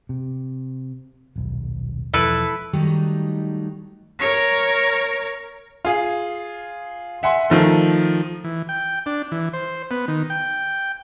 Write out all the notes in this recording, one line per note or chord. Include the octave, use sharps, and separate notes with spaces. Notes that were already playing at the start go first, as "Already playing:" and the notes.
C3
D#1 B1
E1 F3 E4 A4 B4
D#3 F#3 G3 A3 D#4
A#4 C#5
F4 G#4
E5 F#5 G#5 C6
D#3 F3 A3
E3
G5
D4
E3
C5
B3
D#3
G5